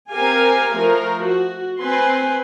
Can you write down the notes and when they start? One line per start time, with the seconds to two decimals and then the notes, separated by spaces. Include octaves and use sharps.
0.12 C4 G4 A#4 F5 G#5
0.77 F3 A3 A#4
1.24 F#4
1.81 C4 B4 G#5 C6